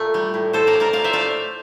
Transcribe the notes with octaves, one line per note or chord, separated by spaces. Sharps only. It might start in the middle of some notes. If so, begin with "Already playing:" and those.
Already playing: A#2 A3
G3
A2
A2 A4 C5
A#4 D5
A2
A#4 D5
A#2 D5 F5
C5 E5
A3 D5 F5